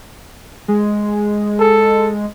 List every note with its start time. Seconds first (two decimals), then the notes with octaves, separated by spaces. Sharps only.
0.68 G#3
1.60 A4